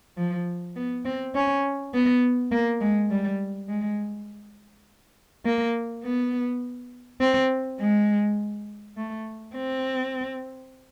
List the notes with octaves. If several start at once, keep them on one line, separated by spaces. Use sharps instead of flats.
F3
B3
C4
C#4
B3
A#3
G#3
G3
G#3
A#3
B3
C4
G#3
A3
C4